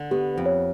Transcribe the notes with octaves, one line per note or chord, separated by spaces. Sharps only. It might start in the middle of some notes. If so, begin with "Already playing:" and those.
Already playing: D3
B3 G4
F2
C#5